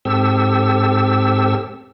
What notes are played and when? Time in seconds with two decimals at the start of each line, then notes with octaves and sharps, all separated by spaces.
0.05 G#2 C4 G4 A4 E6